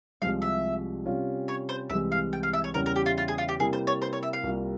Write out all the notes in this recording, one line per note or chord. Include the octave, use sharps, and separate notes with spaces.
C2 C3 F3 G#3 F5
E5
C3 G3 C#4 F4
C#5
C5
C2 C3 E3 G#3 E5
F5
G5
F5
E5
C#5
E2 C#3 G3 C#4 E4 A#4
A#4
G4
F4
F4
G#4
F4
G4
C3 G3 A#3 E4 G#4
C5
C#5
C5
C#5
E5
F5
C2 C3 G3 A#3 F4